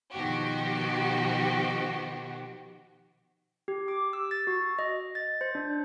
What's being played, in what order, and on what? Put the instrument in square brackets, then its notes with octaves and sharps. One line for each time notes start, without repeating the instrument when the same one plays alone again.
[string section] B2 D#3 F3 F#4 G4
[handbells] G4
D6
E6
A6
F#4
D#5
A6
C5
D4